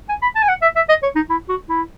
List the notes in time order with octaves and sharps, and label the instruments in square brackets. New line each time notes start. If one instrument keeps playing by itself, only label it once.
[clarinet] G#5
B5
A5
G#5
F#5
E5
E5
D#5
C#5
D#4
E4
F#4
E4